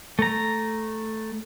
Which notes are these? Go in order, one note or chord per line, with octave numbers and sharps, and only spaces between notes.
A3 A#5